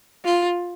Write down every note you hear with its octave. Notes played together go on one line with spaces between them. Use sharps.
F4